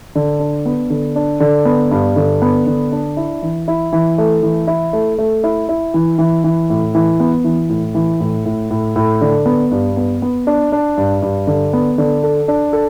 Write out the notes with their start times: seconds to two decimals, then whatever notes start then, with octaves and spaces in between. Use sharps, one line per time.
0.15 D3
0.40 D4
0.66 B3
0.90 D3
1.16 D4
1.40 D3
1.65 B3
1.91 G2
2.16 D3
2.42 B3
2.67 D3
2.92 D4
3.17 E4
3.42 E3
3.68 E4
3.93 E3
4.18 A3
4.43 E3
4.67 E4
4.93 A3
5.18 A3
5.44 E4
5.69 E4
5.94 E3
6.18 E3
6.44 E3
6.70 A2
6.95 E3
7.20 B3
7.44 E3
7.69 A2
7.95 E3
8.20 A2
8.46 A2
8.71 A2
8.96 A2
9.21 D3
9.46 B3
9.71 G2
9.97 B3
10.22 B3
10.47 D4
10.72 D4
10.97 G2
11.22 G2
11.47 D3
11.73 B3
11.98 D3
12.23 A4
12.48 D4
12.73 A4